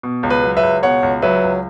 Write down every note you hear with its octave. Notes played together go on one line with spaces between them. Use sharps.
B2
C#2
B4
F#3
B4 E5
C#2
B2 C#5 F#5
C#2
F#3 B4 E5
C#2